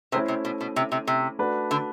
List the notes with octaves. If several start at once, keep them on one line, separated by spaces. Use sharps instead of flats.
C3 A3 C#4 E4 A4 C5
C3
B2
B2
C3
C3
C3
A3 D4 F#4 B4
D3